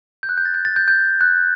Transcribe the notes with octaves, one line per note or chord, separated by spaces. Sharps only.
G6
F#6
G6
A6
G6
A6
G6
G6
F#6